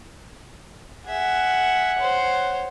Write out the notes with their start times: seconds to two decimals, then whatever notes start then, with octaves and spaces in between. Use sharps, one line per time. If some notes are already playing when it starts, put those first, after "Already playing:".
1.05 G#4 E5 F#5
1.99 C5 C#5